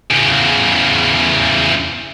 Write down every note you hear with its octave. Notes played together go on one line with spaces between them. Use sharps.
E2 C#3